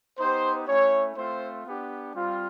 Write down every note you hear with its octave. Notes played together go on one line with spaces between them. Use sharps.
B3 D#4 G4 C5
A3 C#4 E4 C#5
A3 C4 F4 C5
B3 D4 G4
G3 C4 F4